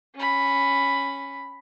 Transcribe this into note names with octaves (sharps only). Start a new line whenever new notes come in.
C#4 B5